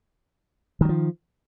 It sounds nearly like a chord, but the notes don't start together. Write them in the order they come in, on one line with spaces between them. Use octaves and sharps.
D#3 F#3 F3